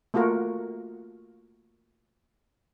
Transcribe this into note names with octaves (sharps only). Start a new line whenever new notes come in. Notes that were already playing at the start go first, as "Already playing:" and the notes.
A3 A#3 F4 F#4 A#4